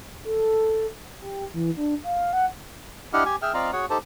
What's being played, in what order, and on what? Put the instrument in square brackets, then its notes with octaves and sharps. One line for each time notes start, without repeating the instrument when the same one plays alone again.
[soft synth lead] A4
G4
E3
D4
F5
F#5
[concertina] D4 E4 G4 D#5 F#5 F6
G4 G#5
G#4 E5 G5 F6
C4 F4 D5 D#5 F5 A#5
F#4 G#4 C#5 F#5
D#4 G4 A4 C5 A5